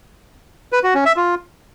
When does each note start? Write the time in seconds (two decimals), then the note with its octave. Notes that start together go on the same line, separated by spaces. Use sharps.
0.73 B4
0.84 F#4
0.95 C#4
1.06 E5
1.17 F4